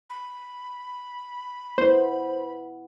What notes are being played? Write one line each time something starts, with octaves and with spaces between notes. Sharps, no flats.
B5
B3 E4 C5